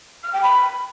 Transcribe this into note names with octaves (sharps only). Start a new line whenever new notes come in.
F6
G5
B5